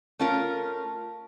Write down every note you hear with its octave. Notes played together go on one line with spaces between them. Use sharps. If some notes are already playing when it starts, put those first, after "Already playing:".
A3 C#4 F4 A#4